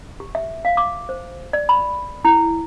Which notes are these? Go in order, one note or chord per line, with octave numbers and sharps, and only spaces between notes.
G4
E5
F5
D6
C5
D5
B5
E4